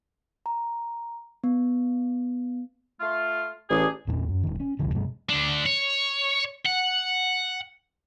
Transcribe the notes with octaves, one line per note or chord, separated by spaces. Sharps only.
A#5
B3
A3 F4
A1 D4 G4 G#4
E2 A#2 B3 C4
F#2
E1 D#3
C#4
D1 C2 F2 D3
G2 B2 G3
D2 D4
C#5
F#5